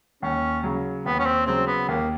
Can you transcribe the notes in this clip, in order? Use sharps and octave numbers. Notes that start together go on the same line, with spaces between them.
D#2 C#4
C#3 F#3
D#2 B3
C#4
C4
C#3 F#3 C4
B3
D#2 A#3